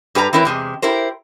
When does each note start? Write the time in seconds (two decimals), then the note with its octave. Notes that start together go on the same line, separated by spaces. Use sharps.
0.15 G2 G4 B4 G#5 A#5
0.33 E3 C4 E4 A#4 B4 C#5
0.45 E2 C3 G#3
0.82 E4 G4 A#4 C5